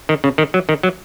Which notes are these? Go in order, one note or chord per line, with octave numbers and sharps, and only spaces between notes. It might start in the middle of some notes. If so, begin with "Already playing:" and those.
D#3
C#3
D#3
F#3
D#3
F#3